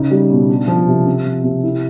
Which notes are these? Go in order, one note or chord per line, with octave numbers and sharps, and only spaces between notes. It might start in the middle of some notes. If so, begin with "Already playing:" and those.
Already playing: C#3 D#4
G3
B2
D4
F3
C3
C4
F3
C3
E4